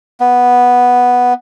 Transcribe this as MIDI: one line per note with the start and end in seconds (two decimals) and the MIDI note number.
0.20 1.33 59